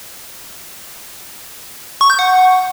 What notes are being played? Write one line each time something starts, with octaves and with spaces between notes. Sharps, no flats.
C#6
G6
F#5